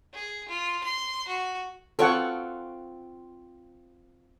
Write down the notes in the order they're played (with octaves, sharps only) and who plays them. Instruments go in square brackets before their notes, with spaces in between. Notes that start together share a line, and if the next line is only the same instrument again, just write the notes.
[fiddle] G#4
F4
C6
F#4
[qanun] C4 F4 C#6 [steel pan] A4 C#5 F#5